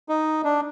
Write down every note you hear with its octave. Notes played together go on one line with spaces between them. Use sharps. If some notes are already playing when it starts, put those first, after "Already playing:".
D#4
D4